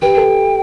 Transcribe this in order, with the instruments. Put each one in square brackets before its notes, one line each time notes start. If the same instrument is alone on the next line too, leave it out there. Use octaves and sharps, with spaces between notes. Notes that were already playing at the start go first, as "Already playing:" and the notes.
[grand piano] G4 B4 [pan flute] G5
[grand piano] A4